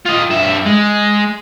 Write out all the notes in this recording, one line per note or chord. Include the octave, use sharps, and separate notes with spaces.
F4 D#5
G2 E5
G#3